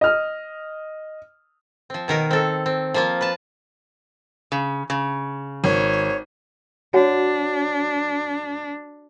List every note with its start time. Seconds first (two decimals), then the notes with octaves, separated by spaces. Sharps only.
0.01 D#5 F6
1.90 F3 C4
2.08 B2 D#3 A#4
2.31 C4 A4
2.66 C4
2.94 F3 A#3 F4
3.21 B4 A5
4.52 C#3
4.90 C#3
5.64 G#1 C#5
6.94 D4 F#4 C#5 F#5